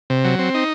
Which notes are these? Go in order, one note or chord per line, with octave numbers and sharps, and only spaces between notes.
C3
F#3
C4
D#4